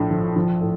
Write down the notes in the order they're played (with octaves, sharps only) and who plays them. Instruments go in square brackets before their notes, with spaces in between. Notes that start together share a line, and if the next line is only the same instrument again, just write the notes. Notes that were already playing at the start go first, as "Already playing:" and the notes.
Already playing: [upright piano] A#1 A2 F3
F3
F3
A2